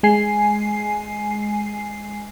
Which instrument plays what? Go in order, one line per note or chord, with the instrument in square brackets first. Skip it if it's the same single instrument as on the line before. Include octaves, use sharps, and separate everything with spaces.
[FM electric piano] G#3 G#5 C7